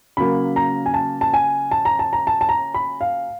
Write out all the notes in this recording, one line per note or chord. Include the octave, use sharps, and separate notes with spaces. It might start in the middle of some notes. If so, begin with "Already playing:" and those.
C#3 F#3 A#3 C#4 B5
A#5
G#5
A5
A5
G#5
A5
A#5
A5
A#5
A5
A5
A#5
B5
F5